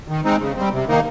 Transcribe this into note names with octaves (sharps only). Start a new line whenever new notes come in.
D#3
G#3 C4 D#4
C#3
G3 C4
C3
D#3 A#3 D#4